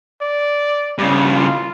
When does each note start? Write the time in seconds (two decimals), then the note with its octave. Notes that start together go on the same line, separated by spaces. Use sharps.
0.21 D5
0.98 G2 C#3
1.36 F4